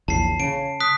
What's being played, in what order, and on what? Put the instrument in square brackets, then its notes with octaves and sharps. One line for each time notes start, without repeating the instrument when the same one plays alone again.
[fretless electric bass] A#1 E2 C#3 [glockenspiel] A5 C7
[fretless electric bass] C#3 [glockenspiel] D7
[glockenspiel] D#6 F#6 B6